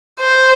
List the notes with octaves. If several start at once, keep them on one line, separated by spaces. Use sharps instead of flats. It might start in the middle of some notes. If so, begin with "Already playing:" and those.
C5